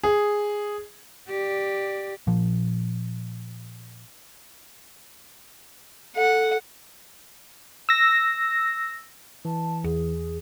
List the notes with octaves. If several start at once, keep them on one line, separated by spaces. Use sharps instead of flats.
G#4
G4 D5
A#2 F3
A4 F#5
E6 A#6
E3 A5
E2 G#4